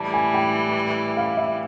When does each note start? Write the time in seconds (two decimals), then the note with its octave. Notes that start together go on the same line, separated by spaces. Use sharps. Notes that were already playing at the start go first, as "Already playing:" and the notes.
Already playing: A2 E3 G3 A5
0.14 G#5
0.34 G5
1.17 F5
1.37 E5